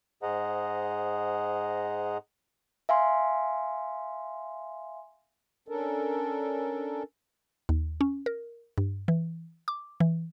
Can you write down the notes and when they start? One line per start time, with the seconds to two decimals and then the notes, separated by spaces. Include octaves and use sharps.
0.23 G#2 G#4 C5 D#5 F#5 A#5
2.89 E5 F5 G#5 C6
5.68 C#4 D4 A4 A#4
7.69 D#2
8.01 C#4
8.26 A#4
8.78 G2
9.08 E3
9.68 D6
10.00 E3